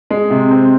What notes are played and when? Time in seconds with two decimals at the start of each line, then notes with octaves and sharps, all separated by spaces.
0.11 G#3
0.30 C3
0.51 C4